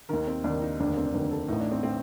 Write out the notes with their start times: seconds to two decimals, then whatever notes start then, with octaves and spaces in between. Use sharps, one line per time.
0.09 D#2 D#3 A#4
0.27 C4
0.44 D#2 D#3 D4
0.62 D#4
0.80 F1 D#2 D3 D4
0.87 A#3
0.97 C4
1.05 D4
1.14 F1 D#2 D3 A#4
1.31 A4
1.48 A1 A2 D#4
1.60 D4
1.72 C4
1.83 A2 C4